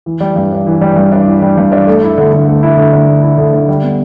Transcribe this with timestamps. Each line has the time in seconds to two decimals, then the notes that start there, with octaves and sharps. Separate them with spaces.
0.06 E3
0.21 G3
0.36 G2
0.52 D4
0.67 E3
0.81 G3
0.96 G2
1.12 D4
1.26 E3
1.42 G3
1.58 G2
1.72 D4
1.87 A3
2.03 E4
2.18 D3
2.33 D3
2.48 A3
2.63 E4
2.77 D3
2.93 D3
3.08 A3
3.23 E4
3.38 D3
3.53 D3
3.68 G3
3.83 B3